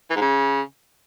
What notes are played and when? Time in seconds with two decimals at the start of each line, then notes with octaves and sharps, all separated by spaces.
0.10 E3
0.16 G#2
0.21 C#3